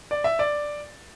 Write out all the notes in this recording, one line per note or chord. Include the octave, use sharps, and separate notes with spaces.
D5
E5
D5